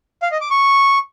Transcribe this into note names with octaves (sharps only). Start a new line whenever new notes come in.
F5
D#5
D6
C#6